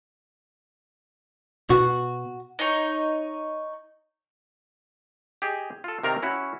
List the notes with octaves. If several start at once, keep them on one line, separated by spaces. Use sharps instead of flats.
B2 F#4
D#4 C#5
G4 G#4 D#5
F4 A4
C3 D#3 A#4 D5 F5 A#5
C#4 E4 F#4